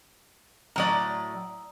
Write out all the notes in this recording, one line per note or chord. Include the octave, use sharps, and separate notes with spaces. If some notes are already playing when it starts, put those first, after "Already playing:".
A2 F#3 D5 A#5 D#6